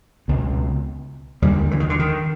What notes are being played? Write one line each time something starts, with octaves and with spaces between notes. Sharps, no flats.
C#2 B2
D#2 D3 G3
E3
D#3
D3
D#3